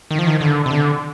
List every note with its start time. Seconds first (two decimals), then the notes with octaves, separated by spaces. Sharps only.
0.11 D#3
0.19 F3
0.27 D#3
0.41 D3
0.66 C3
0.71 D3